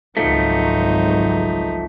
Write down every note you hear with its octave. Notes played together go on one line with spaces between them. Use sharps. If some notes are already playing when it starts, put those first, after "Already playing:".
G#1 C#2 F3 F#3 A3 D#4 C5